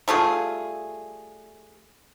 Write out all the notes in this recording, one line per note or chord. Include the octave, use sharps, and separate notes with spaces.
G3 A3 F4 G#4